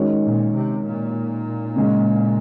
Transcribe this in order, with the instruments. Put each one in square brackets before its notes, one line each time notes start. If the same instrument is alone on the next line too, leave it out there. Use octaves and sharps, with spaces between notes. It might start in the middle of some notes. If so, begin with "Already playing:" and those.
Already playing: [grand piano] D#3 G#3 C#4 F#4 C#5
[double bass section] A#2
C3
A#2
[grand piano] C#3 G#3 C#4